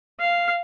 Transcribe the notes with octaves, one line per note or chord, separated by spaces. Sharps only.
F5